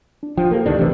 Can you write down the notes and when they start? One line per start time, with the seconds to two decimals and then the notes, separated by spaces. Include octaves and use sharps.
0.23 D4
0.37 F3 G5
0.51 A#3 G4 A4 A#4
0.66 C#2 D#3 D4
0.79 B1 C3 E3 A3 B4